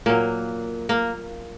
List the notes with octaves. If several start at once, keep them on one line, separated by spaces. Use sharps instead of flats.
A#2 F#3 A#3
A#3